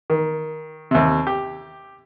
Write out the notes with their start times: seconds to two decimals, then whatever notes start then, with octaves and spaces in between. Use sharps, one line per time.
0.10 D#3
0.91 D#2 C3
1.27 G4